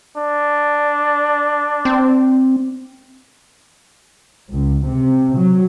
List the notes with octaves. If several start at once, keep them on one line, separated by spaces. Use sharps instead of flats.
D4
C4
C#2
C3
F#3